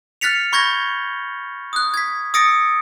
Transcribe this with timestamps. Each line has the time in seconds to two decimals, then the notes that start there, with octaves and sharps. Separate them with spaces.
0.21 F6 F#6 A6 B6 C#7 F7
0.53 B5 C#6 G6 G#6 A#6 G7
1.73 D#6 F#6
1.94 G#6 B6
2.34 D#6 E6 A6 A#6 C#7 D7